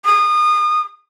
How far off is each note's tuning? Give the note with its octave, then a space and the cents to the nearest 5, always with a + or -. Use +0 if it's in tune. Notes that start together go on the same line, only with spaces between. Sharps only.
D#6 -30